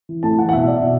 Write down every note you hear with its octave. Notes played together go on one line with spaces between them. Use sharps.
E3
A2 A5
E3 F#5
F#5
B2 E5
D5
E5
B2